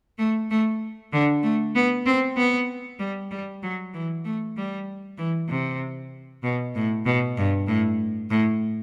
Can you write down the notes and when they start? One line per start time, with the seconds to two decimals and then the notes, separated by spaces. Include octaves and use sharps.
0.18 A3
0.51 A3
1.13 D3
1.43 A3
1.76 B3
2.06 C4
2.37 B3
3.00 G3
3.31 G3
3.63 F#3
3.94 E3
4.25 A3
4.57 G3
5.18 E3
5.49 C3
6.43 B2
6.75 A2
7.06 B2
7.38 G2
7.68 A2
8.31 A2